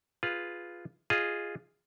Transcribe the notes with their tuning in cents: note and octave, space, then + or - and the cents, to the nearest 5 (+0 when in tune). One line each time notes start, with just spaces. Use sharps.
F4 +0 G#4 +0 B4 +0
F4 +0 G#4 -5 D#5 +0